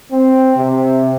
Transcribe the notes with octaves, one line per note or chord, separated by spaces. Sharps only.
C4
C3